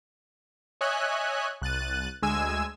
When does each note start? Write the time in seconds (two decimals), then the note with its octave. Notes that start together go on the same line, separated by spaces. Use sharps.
0.81 C#5 D#5 E5 G#5 F#6
1.62 C2 F#6 A6 D#7
2.23 D2 G#3 G#5 E6 G#6 E7